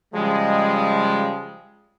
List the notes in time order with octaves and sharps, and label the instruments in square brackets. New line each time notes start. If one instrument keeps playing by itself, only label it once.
[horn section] C#3 F3 G3 G#3